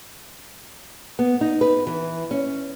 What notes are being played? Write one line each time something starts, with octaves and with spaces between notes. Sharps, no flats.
B3
D#4
B4
E3
C#4